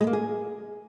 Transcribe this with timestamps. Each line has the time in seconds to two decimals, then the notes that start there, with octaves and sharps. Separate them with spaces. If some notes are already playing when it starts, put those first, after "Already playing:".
0.01 G#3
0.07 A#3
0.13 G#4